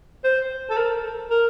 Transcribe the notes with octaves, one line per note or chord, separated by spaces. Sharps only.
C5
A4
A#4
A#4